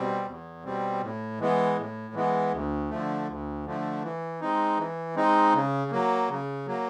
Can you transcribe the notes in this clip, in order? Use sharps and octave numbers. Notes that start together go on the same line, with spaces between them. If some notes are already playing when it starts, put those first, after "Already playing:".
Already playing: B2 G3 C4
E2
B2 G3 C4
A2
E3 G#3 B3
A2
E3 G#3 B3
D2
D3 F3 A3
D2
D3 F3 A3
E3
G#3 C4 D#4
E3
G#3 C4 D#4
C#3
F#3 A#3
C#3
F#3 A#3